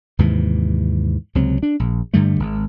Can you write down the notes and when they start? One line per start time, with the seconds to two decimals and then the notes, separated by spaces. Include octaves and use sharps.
0.19 D#2 G#2 C3 E3
1.35 C#2 C3 F#3 C4
1.63 D4
1.80 A#1
2.14 G2 D3 G3 A3
2.40 G#1